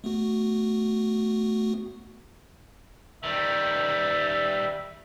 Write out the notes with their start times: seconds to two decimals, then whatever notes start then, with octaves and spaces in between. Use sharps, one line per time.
0.04 A3 B3 F#4
3.23 D#3 G3 E5